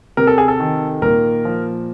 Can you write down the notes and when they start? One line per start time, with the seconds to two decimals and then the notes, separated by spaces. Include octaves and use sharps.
0.17 C3 A#4
0.27 A4
0.38 G#4
0.48 A4
0.60 D#3
1.02 A#2 A#4
1.45 F3